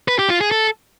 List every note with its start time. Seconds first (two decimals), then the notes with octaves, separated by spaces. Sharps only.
0.08 B4
0.19 G4
0.30 F4
0.41 G#4
0.51 A4